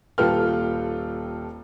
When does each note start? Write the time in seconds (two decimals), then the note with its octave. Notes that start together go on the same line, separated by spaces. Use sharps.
0.18 D#1 F4 A4 B4 G5 F6